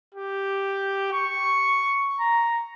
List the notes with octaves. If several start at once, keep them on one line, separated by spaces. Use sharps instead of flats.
G4
C#6
A#5